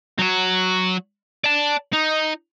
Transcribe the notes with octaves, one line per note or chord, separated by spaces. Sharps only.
F#3 F#4
D5 A5
D#4